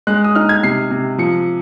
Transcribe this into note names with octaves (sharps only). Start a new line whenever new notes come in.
G#3 F#6
D#6
D#4 F6
G#6
C3 C7
C3
F3 C#7